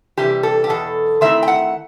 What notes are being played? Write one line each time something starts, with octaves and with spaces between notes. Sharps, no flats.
C3 E3 G3 G4
A4
G4
E2 B2 A4
D#3 A3 C4 E4 E5
G5
F#5